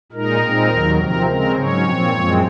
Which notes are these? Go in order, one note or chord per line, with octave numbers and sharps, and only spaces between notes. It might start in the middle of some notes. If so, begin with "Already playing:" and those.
A#2 G#3 D#4 A#4
A#2 G#3 C4 D#4
D#2 D#3 F#3
C3 F3 C4 A#4
C#3 G#3 C4 A#4
G#2 F#3 C#4 C#5
A#2 F3 C4
F#2 F3 G#3 C4